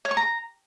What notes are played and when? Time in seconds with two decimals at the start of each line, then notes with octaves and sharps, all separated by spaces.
0.05 C#5
0.11 C#6
0.17 A#5